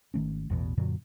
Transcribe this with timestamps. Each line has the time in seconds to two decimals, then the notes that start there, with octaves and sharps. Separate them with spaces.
0.14 G#1 D#3 A3 C#4
0.50 A1 E2 B2
0.77 F#2 A#2 D3 F#3